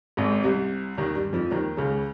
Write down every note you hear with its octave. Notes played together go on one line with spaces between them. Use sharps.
G#1 G#2
C2 C3
D#2 D#3
G2 G3
F2 F3
D#2 D#3
C#2 C#3